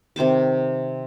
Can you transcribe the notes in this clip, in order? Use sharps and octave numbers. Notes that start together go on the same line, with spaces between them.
C3 D#3 C5 D6